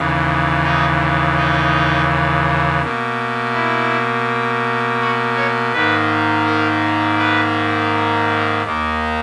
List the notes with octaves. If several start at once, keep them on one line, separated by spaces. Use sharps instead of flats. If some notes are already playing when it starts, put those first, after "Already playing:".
Already playing: D#2 C#3 E3
D#4
D#4
B2 A#3
E4
F#4
C#5
G#2 D#3 A#3 B4
A#4
B4
D#2 D#3 A#3